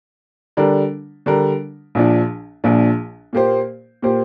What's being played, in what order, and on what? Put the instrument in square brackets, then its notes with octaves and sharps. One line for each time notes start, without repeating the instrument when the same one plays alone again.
[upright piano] D3 G3 D4 A#4
D3 G3 D4 A#4
A#1 A#2 F3 D4
A#1 A#2 F3 D4
A#2 A#3 G4 C5
A#2 A#3 G4 C5